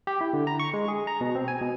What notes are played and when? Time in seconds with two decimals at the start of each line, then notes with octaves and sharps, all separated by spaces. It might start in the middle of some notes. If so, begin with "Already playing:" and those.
0.07 G4
0.21 E4
0.33 D3
0.47 A#5
0.60 C#6
0.74 G#3
0.88 G#4
1.07 A#5
1.21 B2
1.35 C4
1.48 G#5
1.61 B2